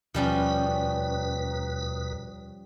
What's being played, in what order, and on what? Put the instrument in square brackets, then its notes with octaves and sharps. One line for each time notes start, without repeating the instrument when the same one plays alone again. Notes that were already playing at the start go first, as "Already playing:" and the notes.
[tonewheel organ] D#2 B2 B4 [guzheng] F3 G3 C#4